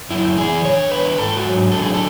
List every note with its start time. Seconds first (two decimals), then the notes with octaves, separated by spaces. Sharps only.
0.10 F#2 E4
0.37 E3 G#4
0.65 D3 C#5
0.91 E2 B4
1.18 G#2 A4
1.36 F#4
1.45 F#3
1.72 D3 A4
1.82 G#4
1.94 A4